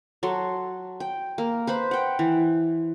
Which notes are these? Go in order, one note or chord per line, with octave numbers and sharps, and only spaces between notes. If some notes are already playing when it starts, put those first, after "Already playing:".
F#3 A4 C6
G5
A#3
B4 C5 B5
F#5 G5
E3